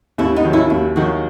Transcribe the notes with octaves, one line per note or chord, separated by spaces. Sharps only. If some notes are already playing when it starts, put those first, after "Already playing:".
D#2 C#4 E4
B3 D#4
D#3 F#3
C#4 E4
D#2 C#4 E4
D#3 F#3 D#4 F#4